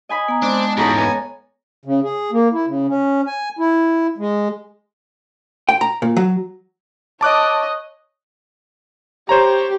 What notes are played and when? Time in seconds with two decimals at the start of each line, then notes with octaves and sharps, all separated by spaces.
0.09 D#5 G#5 B5
0.28 B3 A#5
0.42 G#3 C4 D4 D6
0.77 E2 G#2 C#4 F#4 G#4 A4 A#5 B5
0.97 B3 G#5
1.85 C#3
2.03 G#4
2.32 A#3
2.53 E4
2.67 C#3
2.88 C#4
3.27 G#5
3.59 E4
4.18 G#3
5.69 G5
5.81 A#5
6.02 A#2
6.16 F#3
7.21 C#5 D#5 A5 D6 F#6
9.29 G4 C5 C#5 A#5